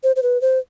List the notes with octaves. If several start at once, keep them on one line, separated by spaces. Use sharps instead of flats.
C5
C5
B4
C5